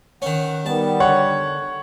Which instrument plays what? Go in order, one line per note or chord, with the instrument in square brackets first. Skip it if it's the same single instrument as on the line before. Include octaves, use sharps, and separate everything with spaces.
[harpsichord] D#3 C#4 [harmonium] F#5
[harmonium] D#3 B3 [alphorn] G3 [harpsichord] A5
[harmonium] D3 [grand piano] C#5 F#5